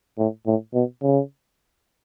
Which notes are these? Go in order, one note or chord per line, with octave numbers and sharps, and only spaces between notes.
A2
A2
B2
C#3